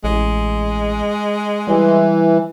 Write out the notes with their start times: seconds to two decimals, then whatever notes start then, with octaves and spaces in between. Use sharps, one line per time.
0.04 A1 G#3
1.67 E3 G3